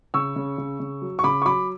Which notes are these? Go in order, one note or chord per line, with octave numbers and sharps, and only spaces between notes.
C#3 C#6 E6
C#3
C#3
C#3
F#3
C#6
C#3 B5 D6
C#6
F#3 B5 D6